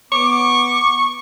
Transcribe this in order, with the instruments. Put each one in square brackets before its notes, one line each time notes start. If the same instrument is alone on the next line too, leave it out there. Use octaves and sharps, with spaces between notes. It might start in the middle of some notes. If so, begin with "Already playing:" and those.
[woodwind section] B3 D6 [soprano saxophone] C#6